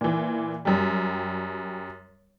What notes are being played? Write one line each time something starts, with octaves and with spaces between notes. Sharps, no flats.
A#2 E3
F#2 G3